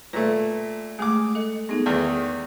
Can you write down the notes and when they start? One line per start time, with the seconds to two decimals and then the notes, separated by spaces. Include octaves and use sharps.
0.13 A#2 A3 B4 C#5
0.99 G#3 A3 G#4 D6
1.35 A4 D#5
1.69 G#3 B3 D#4 A4
1.86 E2 D#3 G#4 B4